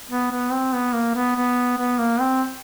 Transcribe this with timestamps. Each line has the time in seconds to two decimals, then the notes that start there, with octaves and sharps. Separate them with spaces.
0.11 B3
0.31 B3
0.52 C4
0.73 B3
0.94 A#3
1.15 B3
1.36 B3
1.78 B3
1.99 A#3
2.20 C4